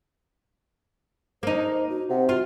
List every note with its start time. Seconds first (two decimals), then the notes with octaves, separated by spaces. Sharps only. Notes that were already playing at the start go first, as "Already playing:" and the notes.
1.43 A#3 D#4 C5
1.89 F#4
2.10 C3 F#5
2.29 F4 F#4